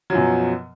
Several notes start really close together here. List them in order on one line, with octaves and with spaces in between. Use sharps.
F#3 F3 F#2 B2